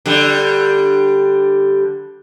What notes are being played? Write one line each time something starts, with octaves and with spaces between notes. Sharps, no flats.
D3 G3